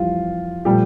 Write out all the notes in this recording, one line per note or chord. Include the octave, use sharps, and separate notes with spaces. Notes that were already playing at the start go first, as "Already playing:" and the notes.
Already playing: F2 E3 G3 F4
A#2 F3 G3 A3 G4